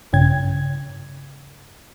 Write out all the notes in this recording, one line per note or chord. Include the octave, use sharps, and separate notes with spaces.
A#1 G2 C#3 G#6